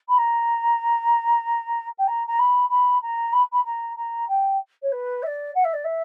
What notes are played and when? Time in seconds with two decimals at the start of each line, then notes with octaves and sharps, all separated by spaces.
0.08 B5
0.18 A#5
1.98 G5
2.07 A#5
2.27 A#5
2.39 B5
2.69 B5
3.02 A#5
3.32 B5
3.52 B5
3.65 A#5
3.96 A#5
4.28 G5
4.82 C#5
4.92 B4
5.22 E5
5.26 D5
5.55 F#5
5.64 E5
5.73 D5
5.84 E5